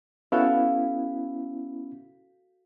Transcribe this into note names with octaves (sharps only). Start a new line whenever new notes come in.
B3 C#4 E4 F#4 A4 F5